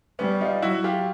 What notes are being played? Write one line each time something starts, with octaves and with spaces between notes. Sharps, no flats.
G3 B3 C#4
D#4 F4
F#3 E4 F#4
F4 G4